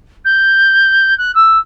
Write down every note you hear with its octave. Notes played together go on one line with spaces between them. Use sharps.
G6
F#6
E6